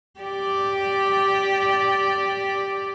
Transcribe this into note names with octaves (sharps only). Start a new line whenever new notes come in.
G4 D5